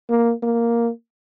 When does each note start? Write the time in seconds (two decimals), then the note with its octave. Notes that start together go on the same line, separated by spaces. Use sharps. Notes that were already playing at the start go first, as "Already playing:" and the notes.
0.10 A#3
0.43 A#3